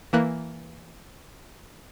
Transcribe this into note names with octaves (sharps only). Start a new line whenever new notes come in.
E3 A#3 F#6